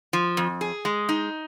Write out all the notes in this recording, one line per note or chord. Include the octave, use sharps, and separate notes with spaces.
F3
F2
G#4
G#3
D#4